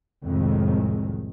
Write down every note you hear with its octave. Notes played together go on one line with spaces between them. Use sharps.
C2 F2 A2 D#3 G#3